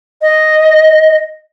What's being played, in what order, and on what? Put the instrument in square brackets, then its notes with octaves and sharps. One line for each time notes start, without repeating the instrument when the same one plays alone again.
[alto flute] D#5